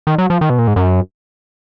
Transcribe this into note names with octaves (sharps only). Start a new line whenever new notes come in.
D#3
F#3
F3
D#3
B2
A#2
G#2
F#2